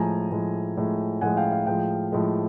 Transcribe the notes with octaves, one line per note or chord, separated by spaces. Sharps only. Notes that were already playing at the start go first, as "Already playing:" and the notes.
Already playing: A2 F3 G#3 G#5 A#5
A2 F3 G#3
A2 F3 G#3
A2 F3 G#3 F#5 G#5
F5 G5
F5
A2 F3 G#3 F5 G5
A2 F3 G#3